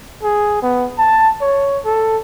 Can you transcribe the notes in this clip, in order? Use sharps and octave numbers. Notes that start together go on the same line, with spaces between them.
G#4
B3
A5
C#5
A4